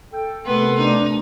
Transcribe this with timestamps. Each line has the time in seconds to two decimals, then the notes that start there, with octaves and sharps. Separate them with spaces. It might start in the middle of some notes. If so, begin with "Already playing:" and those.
0.12 A4 G5
0.46 C3 A3 B3 A4 A#4 C6
0.78 D4 D#4